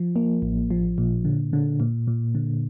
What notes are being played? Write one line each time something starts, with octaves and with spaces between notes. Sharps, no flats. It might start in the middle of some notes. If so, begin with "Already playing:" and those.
Already playing: F3
A#3
A1
F3
A#2
D3
D3
A#2
A#2
D3